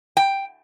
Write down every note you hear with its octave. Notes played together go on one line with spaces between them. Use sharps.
G5